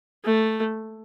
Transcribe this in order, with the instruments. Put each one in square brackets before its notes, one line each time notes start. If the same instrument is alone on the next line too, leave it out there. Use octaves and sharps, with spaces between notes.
[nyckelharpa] A3